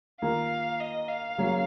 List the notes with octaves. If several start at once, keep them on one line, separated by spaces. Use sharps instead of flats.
D#3 A#3 F4 A#4 F5
D#5
F5
C#3 F#3 A#3 C#4